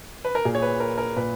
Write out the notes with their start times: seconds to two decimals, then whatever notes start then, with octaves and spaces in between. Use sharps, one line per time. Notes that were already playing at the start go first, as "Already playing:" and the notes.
0.25 B4
0.35 A#4
0.45 A#2 G#4
0.55 C#5
0.62 B4
0.80 A#4
0.98 A#4
1.16 A#2 B4